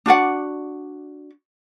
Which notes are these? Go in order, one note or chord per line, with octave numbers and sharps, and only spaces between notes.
D4 F#4 D5 F#5